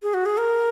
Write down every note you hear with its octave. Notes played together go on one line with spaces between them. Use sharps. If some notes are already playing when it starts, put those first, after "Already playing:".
G#4
F#4
G#4
A#4